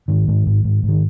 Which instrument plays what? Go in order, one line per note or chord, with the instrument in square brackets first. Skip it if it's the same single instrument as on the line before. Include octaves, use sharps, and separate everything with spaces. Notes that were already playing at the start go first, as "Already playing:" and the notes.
[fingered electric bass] G#2 D#3
G#2
G#2
G#2
G#2
D#3